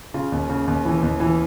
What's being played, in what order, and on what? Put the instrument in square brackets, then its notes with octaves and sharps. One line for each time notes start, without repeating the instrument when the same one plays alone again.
[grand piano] C#3 F4
D#2
C#3
D#2
E3
D#2
E3